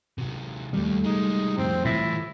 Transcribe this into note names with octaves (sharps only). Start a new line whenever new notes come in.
C3 F#3
D#2 D#3 G3 A3
C3 G#3 D#4
F2 A2 C4
A2 E3 F3 E4